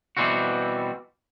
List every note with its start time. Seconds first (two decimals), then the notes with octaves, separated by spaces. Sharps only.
0.17 B2 E3 G3 C4 F#4